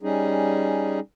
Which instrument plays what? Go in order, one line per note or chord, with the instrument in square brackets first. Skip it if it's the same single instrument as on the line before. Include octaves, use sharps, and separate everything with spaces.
[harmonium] G3 C#4 D#4 G#4